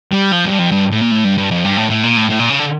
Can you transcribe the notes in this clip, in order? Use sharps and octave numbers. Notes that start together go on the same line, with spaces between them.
G3
F3
G2
F2
G2
A2
A#2
A2
G2
G2
F2
G2
A2
A2
A#2
A2
A2
A#2
C#3
D3